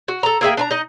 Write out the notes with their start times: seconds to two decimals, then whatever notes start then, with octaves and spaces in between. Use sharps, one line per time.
0.08 F#4
0.23 A4 A#5
0.41 A#3 G#4 E5 G5
0.57 D4 G#5 A#5
0.71 D#4 D#5